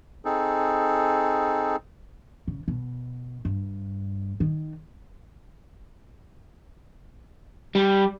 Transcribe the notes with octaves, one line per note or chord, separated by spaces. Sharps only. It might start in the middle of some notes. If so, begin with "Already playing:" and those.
C4 D#4 G#4 A4
C#3
B2
G2
D#3
G3